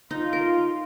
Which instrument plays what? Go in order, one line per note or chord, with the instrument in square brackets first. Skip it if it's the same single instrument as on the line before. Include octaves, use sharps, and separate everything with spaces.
[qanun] D#4 [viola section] F4
[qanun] A#4